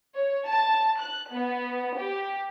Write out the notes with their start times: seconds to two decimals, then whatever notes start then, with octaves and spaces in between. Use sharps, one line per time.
0.15 C#5
0.47 A5
1.00 F#6
1.32 B3
1.97 G4